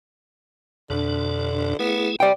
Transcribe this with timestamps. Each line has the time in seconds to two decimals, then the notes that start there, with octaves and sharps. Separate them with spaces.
0.90 F2 B2 D3 D4
1.79 A3 B3 E4 G#4
2.20 C3 D5 G5